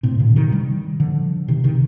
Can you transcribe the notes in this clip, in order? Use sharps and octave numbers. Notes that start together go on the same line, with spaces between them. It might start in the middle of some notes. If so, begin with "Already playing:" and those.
A2 C3
A#2 D3
C3 D#3
D#3 G3
D3 F3
C3 D#3
C3 D#3